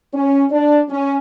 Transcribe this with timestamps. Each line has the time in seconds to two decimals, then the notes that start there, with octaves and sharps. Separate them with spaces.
0.13 C#4
0.50 D4
0.89 C#4